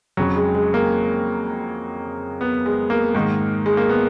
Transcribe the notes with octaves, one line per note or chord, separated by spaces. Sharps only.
F2 C#3 F#3
G#3
G#3
A#3
B3
G#3
A#3
G#2 D#3
G#3
A#3
B3